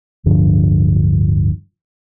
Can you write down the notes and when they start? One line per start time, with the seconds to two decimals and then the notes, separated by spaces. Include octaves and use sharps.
0.26 D1 G2 D3 F3